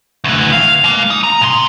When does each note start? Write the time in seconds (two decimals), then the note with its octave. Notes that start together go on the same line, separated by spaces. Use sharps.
0.24 D2 E3
0.52 F5
0.84 G#3 A#3
1.10 D#4
1.23 A#5
1.41 A#2 C6